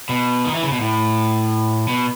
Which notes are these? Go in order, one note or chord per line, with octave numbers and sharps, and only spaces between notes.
B2
D#3
E3
C#3
B2
A2
B2